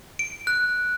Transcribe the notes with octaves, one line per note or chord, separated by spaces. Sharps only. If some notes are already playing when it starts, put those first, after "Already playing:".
D7
F#6